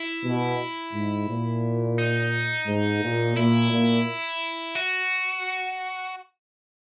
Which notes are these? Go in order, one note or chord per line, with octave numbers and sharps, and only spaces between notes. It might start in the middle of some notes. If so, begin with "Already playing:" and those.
Already playing: E4
B2
G#2
A#2
D#4
G#2
A#2
A#2 E4
A#2
F#4